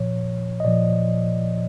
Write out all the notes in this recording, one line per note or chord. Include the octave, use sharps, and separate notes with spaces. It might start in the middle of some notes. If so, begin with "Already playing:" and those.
Already playing: A#2 F3 C#5
D#5
A#2 F3 D5